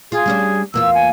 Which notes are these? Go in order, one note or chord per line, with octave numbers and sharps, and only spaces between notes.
F4 G#4
G3 C#4 D4
E2 A#3 F4 E6
G#5